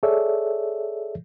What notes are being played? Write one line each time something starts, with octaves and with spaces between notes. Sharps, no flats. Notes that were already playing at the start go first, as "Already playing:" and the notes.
G#4 A4 C#5 D5 E5